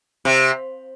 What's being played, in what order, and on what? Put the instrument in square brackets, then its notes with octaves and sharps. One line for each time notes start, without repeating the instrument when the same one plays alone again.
[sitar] C3